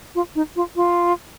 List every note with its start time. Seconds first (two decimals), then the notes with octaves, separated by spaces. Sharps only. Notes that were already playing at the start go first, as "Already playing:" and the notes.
0.15 F4
0.35 D#4
0.56 F4
0.76 F4